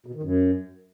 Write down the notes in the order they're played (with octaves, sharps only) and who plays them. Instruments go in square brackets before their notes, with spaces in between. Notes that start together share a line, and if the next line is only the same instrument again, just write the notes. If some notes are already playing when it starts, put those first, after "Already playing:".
[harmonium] B2
D#3
F#2